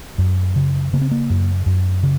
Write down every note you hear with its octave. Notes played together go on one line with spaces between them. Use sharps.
F#2
C#3
C#3 A#3
C4
A#3
F#2
F#2
C#3